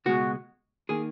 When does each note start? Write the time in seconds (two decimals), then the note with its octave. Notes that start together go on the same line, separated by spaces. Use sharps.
0.06 C#2 B2 G#3 F#4
0.89 D#3 A#3 G#4